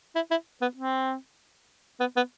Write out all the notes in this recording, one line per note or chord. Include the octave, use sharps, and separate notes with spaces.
E4
E4
B3
C4
B3
B3